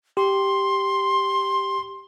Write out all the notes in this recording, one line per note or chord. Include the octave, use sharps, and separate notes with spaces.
G4 C6